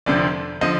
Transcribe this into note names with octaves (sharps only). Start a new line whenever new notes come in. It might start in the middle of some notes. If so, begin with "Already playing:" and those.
F1 F2 D3 F3 D5
D3 F3 D#5